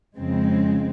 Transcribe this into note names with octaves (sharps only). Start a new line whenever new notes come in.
F2 C#3 G#3 C4